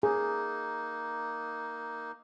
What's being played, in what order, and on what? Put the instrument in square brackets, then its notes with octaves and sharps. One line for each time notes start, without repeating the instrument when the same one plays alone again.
[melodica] A#3 D#4 [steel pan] G#4